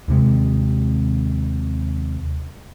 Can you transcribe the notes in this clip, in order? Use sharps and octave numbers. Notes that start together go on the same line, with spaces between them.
D#2 C3 G#3